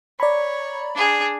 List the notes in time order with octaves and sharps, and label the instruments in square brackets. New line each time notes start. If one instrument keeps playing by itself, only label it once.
[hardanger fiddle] C#5 [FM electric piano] D5 A#5 B5
[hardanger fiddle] D4 G#4